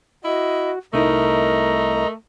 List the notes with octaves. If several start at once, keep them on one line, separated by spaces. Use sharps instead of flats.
E4 F#4 D#5
C2 A3 D#4 E4 A#4 D#5 A#5